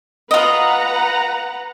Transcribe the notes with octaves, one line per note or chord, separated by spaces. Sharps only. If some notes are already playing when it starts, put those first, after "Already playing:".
F4 B4 D#5 F#5 A#5